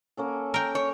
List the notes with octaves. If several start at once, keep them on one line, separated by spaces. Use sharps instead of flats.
A#3 C#4 A4
A#4 G5
C#5